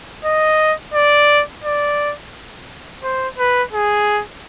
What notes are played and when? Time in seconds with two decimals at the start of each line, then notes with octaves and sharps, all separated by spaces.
0.25 D#5
0.94 D5
1.65 D5
3.04 C5
3.38 B4
3.74 G#4